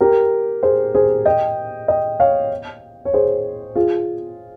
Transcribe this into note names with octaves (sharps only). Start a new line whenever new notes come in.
G4 A#4
G#4 C5
G#4 C5
D#5 G5
D#5 G5
C#5 F5
C#5
G#4 C5
F4 G#4